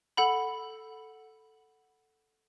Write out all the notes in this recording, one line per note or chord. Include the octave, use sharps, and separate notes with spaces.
A4 F#5 B5